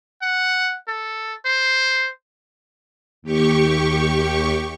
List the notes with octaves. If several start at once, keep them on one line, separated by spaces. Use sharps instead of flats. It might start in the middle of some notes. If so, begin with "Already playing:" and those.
F#5
A4
C5
D#2 G4 C#6